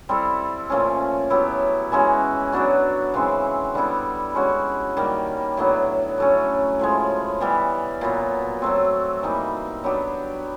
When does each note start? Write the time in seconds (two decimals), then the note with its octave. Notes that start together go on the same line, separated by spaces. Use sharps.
0.09 G3 C4 E4 A4
0.70 A#2 F3 A3 C#4
1.30 F#3 B3 E4 G4
1.92 E3 G#3 C#4 F#4
2.52 F#3 B3 D4 F#4
3.14 C#3 E3 G#3 C4
3.74 D3 G3 B3 E4
4.35 G#3 C#4 F#4
4.97 D#3 G3 A#3
5.57 A2 F#3 B3 D4
6.18 F#3 A3 C#4
6.79 A2 F3 G#3
7.41 E3 G3 B3
8.01 A#2 F#3 B3
8.62 F#3 A3 C4
9.22 E3 G3 A#3 D#4
9.84 F#3 B3 D4 G4